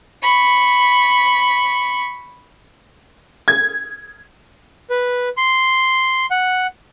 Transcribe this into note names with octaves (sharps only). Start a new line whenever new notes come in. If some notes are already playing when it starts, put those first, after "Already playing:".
B5 C#6
G#6
B4
C6
F#5